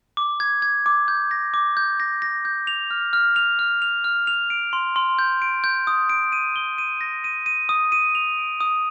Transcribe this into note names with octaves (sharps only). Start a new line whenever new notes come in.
D6
G#6
G#6
D6
G6
A#6
D6
G6
A#6
A#6
G6
F7
F6
F6
F7
F6
F7
F6
F7
D7
C6
C6
G6
D7
G6
D#6
D7
D#7
G7
D#7
A#6
D#7
D#7
D#6
D#7
F7
D7
D#6